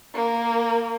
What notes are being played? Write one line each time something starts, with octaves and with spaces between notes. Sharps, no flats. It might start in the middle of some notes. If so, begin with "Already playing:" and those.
A#3